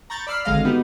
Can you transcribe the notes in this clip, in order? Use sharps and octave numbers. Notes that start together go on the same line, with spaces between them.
A#5 B5 C#6 G6 A6
D5 B5 E6 F6 C7
G#1 D3 G#3 D#5 F5 F6
B3 D#4 F#4 G4 B4